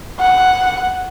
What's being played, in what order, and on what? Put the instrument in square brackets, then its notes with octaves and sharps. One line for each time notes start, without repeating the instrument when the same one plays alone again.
[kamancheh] F#5